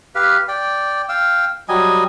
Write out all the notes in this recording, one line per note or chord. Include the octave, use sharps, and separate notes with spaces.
G4 B4 F5
D5 G5
F5 G5 E6
F#3 G3 D#5 G#5